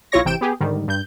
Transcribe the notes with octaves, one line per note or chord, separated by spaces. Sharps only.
B1 E4 F4 C#5 C#6 A#6
G#1 C3 E3 G5 D7 E7
B3 G4 G#4
G#2 D3 D#3 G3
G2 G6